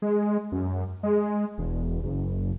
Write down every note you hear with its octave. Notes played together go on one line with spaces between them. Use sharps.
G#3
F#2
G#3
E1
F#1